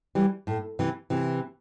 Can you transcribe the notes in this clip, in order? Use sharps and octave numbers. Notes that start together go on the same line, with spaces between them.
E3 G3
A2
C3 E3
C3 E3